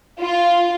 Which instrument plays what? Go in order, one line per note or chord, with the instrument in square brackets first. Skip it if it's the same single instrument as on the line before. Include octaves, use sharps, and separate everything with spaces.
[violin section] F4